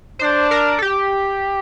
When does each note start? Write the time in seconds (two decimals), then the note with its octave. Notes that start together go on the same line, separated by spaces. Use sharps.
0.19 D4 C5
0.51 A#4
0.79 A4
0.82 G4